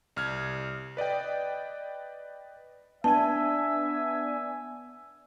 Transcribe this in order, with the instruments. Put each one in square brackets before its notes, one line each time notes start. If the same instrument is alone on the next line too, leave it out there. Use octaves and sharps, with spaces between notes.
[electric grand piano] C2 F6 G#6
B4 D5 D#5 G5
[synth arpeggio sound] B3 D4 G#5 [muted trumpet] E5 [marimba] A5